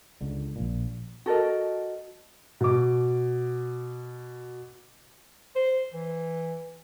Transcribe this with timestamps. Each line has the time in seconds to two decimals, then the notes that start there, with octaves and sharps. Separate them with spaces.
0.21 C#2 D3
0.56 A#1 A#2
1.26 F#4 A4 A#4 D#5
2.61 B2 D6
5.56 C5
5.94 E3